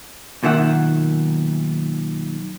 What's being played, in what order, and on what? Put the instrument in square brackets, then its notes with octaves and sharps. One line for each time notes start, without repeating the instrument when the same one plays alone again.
[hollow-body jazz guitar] B1 A#2 D#3 E5 F#5